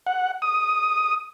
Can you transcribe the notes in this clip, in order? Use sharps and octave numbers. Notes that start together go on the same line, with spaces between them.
F#5
D#6